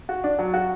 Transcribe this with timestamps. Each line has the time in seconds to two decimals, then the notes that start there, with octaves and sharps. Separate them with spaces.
0.09 F#4
0.24 D4
0.39 F#3
0.54 F#4